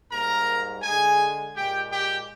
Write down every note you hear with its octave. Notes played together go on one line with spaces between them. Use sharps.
G#2 G3 A#3 A#4 A#5
D3 G#3 G#4 G#5
A#2 G#3 G4 G5
G4 G5